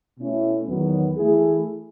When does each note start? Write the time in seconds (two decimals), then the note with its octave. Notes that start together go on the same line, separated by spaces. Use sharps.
0.18 B2 A3 C#4 E4
0.67 E2 D#3 F#3 B3
1.17 E3 A3 E4 G#4